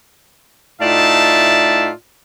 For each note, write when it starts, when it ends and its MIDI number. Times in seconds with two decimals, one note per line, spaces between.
0.82 1.91 45
0.82 1.91 63
0.82 1.91 65
0.82 1.91 74
0.82 1.91 76
0.82 1.91 81